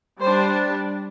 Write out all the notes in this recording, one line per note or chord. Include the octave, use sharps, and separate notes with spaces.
G3 D4 C5